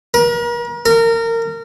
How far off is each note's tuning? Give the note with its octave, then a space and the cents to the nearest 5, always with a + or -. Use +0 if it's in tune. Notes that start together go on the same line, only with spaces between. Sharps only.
A#4 +40
A#4 -25